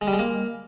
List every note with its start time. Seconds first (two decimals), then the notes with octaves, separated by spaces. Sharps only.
0.01 G#3
0.07 G3
0.13 G#3
0.19 A#3